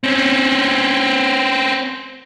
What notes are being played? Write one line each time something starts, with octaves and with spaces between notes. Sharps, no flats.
C4 C#4